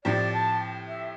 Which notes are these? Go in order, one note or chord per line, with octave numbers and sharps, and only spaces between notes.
A2 F3 C4 G4 D5
A5
E5